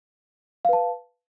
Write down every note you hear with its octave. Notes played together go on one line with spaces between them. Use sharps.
B4 F5 A5